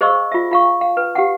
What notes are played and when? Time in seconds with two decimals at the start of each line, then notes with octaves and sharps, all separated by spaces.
0.01 G#4 C5 D#5 F5 C#6 E6
0.32 F4 E5
0.51 F4 F5 C#6
0.81 F5
0.97 B4
1.15 G4 F5 F#5